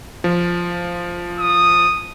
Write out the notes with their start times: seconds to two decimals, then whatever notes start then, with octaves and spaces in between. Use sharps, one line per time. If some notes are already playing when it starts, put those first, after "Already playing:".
0.24 F3
1.39 D#6